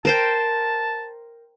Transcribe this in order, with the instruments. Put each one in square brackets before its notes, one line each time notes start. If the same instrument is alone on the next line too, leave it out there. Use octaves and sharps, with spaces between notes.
[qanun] A#4 C5 G5 [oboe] A5